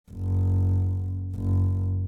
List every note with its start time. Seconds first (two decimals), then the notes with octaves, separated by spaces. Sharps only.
0.12 F#1
1.35 F#1